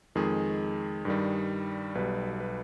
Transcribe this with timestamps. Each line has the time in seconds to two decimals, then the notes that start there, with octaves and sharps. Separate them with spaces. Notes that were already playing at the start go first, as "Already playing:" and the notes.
0.15 F2 D#3 G#3 G#4
1.05 G2 D#3 G3
1.95 B1 B2 G3 B4
2.40 B4